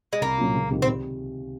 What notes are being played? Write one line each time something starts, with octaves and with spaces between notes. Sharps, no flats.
G#3
C2 A#3
A#2 F#3 C#4 F4
C#2
C3 D#3
C4
C3